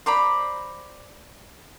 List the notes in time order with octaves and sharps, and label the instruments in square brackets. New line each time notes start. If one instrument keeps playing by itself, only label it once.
[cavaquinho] C5 D5 A#5 B5